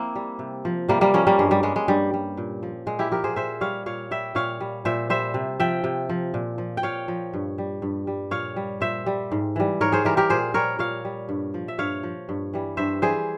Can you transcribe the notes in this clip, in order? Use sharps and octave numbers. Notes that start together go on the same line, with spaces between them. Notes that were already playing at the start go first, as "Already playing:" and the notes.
Already playing: A#3 C4 E4
G3
C3
F3
C3 G3 A#3
G3 A#3
F3 A#3 C#4
G3 A#3
G2 G#3
G3
G3 G#3
G#3
G2 G3
G3
A#2
F3
A#2 G#3
E4 G4
F3 G4 A#4
G#4 C5
A#2 C5 E5
G3 C#5 F5
A#2 C#5 F5
G3 E5 G5
A#2 C#5 F5
G3
A#2 C5 E5
G3 C5 E5
C3
F3 E5 G5
C3
F3
A#2
F3
G5
A#2 C#5 F5
F3
G2
G3
G2
G3
A#2 C#5 F5
G3
A#2 C5 E5
G3
G#2
E3 G3
G#2 A#4 C#5
G#4 C5
E3 G3 G4 A#4
G4 A#4
A#2 G#4 C5
G3 A#4 C#5
A#2 C#5 F5
G3
G2
F3
E5
G2 C#5 F5
F3
G2
E3 G3
G2 C5 E5
E3 G3 G#4 C5